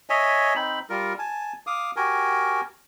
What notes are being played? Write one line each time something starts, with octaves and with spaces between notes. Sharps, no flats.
C#5 D#5 E5 G#5
C4 D#4 B5
G3 F4 A#4
G#5 A5
F5 D6 D#6
F#4 G4 A#4 G#5